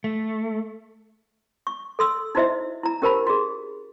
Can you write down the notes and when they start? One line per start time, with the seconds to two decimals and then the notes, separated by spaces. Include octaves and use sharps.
0.04 A3
1.67 C#6
1.99 A4 C6 E6
2.35 D#4 E4 F#4 C5 D#5 E5
2.83 E4 A#5
3.02 C#4 G4 A#4 C5 A5 B5
3.27 F#4 G#4